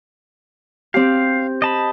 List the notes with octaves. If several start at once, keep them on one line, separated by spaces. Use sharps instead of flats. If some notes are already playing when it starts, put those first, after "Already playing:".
C4 G4 F5
D#5 A5 B5